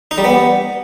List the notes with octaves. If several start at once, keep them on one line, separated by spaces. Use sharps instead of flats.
D#4
G3
B3